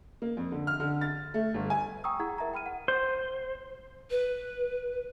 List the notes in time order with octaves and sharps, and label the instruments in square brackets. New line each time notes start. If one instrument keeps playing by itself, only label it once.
[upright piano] A#3
F2
D3
F6
D3
A6
A3
G1
G#5
[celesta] G5 A#5 C#6 D#6 E6
E4 G#4 F#5 A#5 G#6
A#4 E5 A5 A#5
G5 B5 F6 D#7
F#5
[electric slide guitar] C5
[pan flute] B4